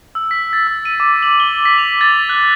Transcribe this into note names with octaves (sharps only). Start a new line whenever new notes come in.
E6
B6
A6
E6
D#7
D6
F#7
G7
B6
F7
A6
F#6